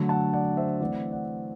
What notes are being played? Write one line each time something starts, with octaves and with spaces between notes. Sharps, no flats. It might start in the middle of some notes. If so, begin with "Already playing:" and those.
Already playing: D3 F#3 A3 D4
F#5 A5
D5 F#5
C5 E5
E3 A3 C4 D5 F#5
D5 F#5